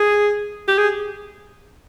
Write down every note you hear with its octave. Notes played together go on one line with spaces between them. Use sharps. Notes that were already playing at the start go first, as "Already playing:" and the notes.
Already playing: G#4
G4
G#4